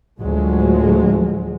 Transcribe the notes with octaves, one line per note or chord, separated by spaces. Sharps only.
D2 A2 F3 F#3 G#3